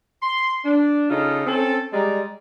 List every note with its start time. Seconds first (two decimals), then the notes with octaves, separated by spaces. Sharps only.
0.22 C6
0.65 D4
1.10 C#3 D#4 F4 A4
1.47 C4 C#4 A4
1.93 G3 G#3 D5 A#5